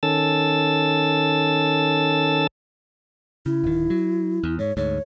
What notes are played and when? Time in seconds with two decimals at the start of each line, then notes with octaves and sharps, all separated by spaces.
0.03 D#3 C#4 A4 E6 A6
3.46 C#3 E4
3.64 D1 D#3
3.90 F#3
4.44 E2
4.59 G#2 C#5
4.77 D2 G#2 C#5